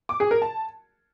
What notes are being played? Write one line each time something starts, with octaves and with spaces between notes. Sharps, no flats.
D6
G#4
A#4
A5